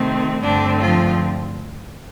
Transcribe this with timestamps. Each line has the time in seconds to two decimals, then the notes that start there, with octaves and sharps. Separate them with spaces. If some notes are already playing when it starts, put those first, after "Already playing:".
Already playing: C3 D#3 A3 C4
0.42 G2 D3 A3 C4 D4
0.81 F3 F4